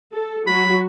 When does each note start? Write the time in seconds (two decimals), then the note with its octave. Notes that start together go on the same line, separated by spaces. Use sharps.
0.12 A4
0.47 F#3 F#4 B5